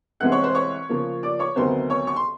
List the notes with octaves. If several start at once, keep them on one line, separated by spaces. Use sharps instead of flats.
C2 C3 E3 G#3 C4 F#5 F#6
C#5 C#6
C5 C6
C#5 C#6
C#3 F3 A#3
D5 D6
C#5 C#6
D2 C3 D#3 F#3 B3 C5 C6
C#5 C#6
C#6
C6